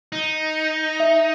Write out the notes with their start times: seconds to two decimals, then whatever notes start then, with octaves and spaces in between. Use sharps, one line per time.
0.12 D#4
1.00 E5